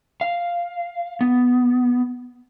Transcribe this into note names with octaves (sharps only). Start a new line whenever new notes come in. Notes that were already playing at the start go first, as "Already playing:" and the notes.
F5
B3